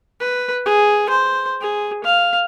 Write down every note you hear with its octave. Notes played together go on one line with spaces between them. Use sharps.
B4
G#4
C5
G#4
F5